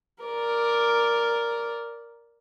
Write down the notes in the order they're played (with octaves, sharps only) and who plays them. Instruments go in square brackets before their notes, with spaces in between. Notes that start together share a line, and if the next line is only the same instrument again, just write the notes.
[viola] A#4 D5